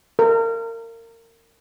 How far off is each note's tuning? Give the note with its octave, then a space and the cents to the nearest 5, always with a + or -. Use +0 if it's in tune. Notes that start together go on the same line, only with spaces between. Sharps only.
A#4 -30